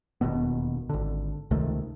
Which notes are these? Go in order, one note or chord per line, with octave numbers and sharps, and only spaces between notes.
E1 D#2 B2 B3
G#1 D3
C#2 C3 D#3 A3